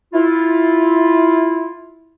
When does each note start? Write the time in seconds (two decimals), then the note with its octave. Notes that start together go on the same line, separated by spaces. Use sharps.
0.13 E4 F4